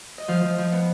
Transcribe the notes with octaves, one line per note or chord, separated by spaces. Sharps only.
D#5
F3 F5
F3
F3
B3